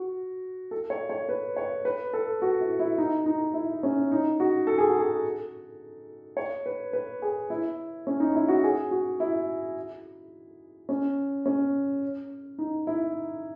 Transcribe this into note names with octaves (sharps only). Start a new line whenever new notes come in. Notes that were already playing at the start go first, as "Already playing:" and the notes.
Already playing: F#4
A4
C#5
C#5
B4
C#5
B4
A4
F#4
E4
E4
D#4
D#4
E4
C#4
D#4
F#4
A4
G#4
F#4
G#4
C#5
B4
B4
G#4
E4
C#4
D#4
E4
F#4
G#4
F#4
E4
C#4
C#4
D#4
E4